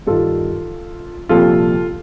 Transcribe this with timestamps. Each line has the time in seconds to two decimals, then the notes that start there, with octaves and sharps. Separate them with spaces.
0.07 G2 D#3 F4 A4
1.29 C2 A#2 F3 F4 A4